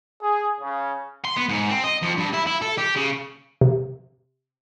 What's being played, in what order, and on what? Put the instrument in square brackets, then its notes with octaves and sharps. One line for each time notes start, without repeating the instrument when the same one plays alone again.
[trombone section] G#4
C#3
[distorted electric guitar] C6
B3
G#2
C4
D#5
F2
G2
E4
E4
A4
G4
C#3
[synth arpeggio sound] C3